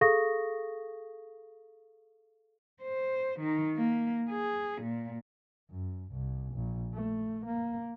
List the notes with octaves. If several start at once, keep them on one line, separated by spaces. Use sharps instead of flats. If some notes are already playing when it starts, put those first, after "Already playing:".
G#4 A4 F5 C#6 D#6 A#6
C5
D#3
A#3
G#4
A#2
F#2
C2
A#1
A3
A#3